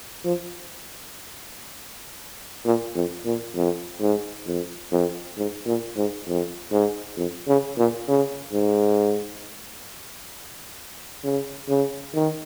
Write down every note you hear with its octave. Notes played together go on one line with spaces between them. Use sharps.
F3
A#2
F2
A#2
F2
G#2
F2
F2
G#2
A#2
G#2
F2
G#2
F2
C#3
A#2
C#3
G#2
C#3
C#3
D#3